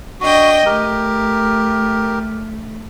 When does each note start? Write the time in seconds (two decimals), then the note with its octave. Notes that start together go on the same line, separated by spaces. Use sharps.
0.21 D4 F#4 D#5 G5
0.66 A3 G4 A#4